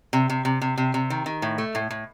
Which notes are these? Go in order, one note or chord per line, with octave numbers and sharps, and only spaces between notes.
C3
C3
C3
C3
C3
C3
D#3
D#3
A2
A3
A2
A2